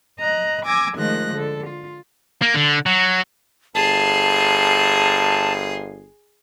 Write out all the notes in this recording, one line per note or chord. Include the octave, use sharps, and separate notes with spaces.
D#5 A#5 F#6
G#5 D6 E6 G#6 A#6
D#3 F3 G#3 A3 F#6 A#6
D3 A4
F4
A#3
D3
F#3
G1 G#4 A5 C6